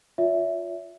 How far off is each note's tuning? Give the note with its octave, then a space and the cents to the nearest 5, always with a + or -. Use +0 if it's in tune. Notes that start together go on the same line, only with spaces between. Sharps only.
F4 +15 C#5 +40 E5 +0